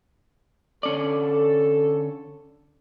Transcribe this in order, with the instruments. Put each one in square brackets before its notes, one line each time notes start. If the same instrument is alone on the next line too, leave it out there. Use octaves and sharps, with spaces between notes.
[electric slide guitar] D3 C#4 D5 [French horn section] A4